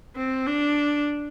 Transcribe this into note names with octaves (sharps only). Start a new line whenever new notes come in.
C4
D4